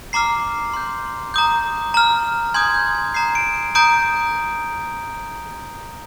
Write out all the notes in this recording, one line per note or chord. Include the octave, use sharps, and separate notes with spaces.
A#5 D6 F6 C7
C6 G6
A#5 D#6 G6
A#5 F6
G#5 C6 D#6 G6 G#6
G6
G#6
A#5 D#6 G6 C7
D7
A#5 D#6 G6 D7